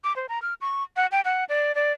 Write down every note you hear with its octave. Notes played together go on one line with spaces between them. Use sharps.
D6
C5
A#5
F6
C#6
F#5
G5
F#5
D5
D5